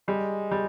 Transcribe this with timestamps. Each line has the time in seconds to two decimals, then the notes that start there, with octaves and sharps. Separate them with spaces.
0.08 G3 G#3
0.51 G3